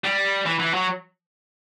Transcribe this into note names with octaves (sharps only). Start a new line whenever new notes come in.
G3
E3
E3
F#3